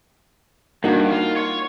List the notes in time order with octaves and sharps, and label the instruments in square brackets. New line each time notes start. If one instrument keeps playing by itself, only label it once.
[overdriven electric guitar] G2 [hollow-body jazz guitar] A#3 D#4 F#4
[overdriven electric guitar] F4
C#5